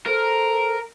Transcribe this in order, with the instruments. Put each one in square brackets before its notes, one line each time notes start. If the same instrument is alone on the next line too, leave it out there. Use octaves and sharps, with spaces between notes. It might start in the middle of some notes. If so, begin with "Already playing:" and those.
[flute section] A4 C5 [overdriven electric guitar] A#4